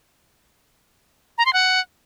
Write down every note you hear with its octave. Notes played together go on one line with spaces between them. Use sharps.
A#5
C6
F#5